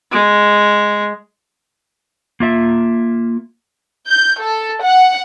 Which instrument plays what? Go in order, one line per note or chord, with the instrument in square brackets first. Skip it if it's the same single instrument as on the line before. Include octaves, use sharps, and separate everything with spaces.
[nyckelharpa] G#3
[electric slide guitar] A#3 F4 E5
[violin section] G6
A4
F#5